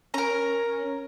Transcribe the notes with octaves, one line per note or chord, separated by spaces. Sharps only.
C#4 A#4 A#5